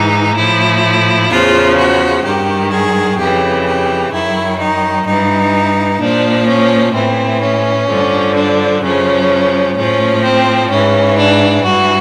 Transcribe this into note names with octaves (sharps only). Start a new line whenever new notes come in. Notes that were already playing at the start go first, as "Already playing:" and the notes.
Already playing: G#2 E3 D#4
A2 F3 E4
E2 C#3 F3 F4
F#4
G2 D#3 G4
G#4
F2 C#3 E3 G4
G4
F#2 D#3 E4
D#4
G2 E3 D#4
A#2 F3 D4
C#4
A2 E3 C4
C#4
G2 D3 F3
D4
F#2 C#3 F3 C#4
A2 F3 C#4
C4
G#2 E3 C#4
D4
G2 E3 F#4